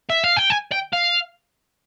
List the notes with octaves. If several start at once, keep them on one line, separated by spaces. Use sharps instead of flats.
E5
F5
G5
G#5
G5
F5